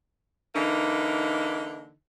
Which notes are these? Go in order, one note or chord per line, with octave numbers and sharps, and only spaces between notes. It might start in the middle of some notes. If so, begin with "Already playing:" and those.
D3 E3 A#3 D#4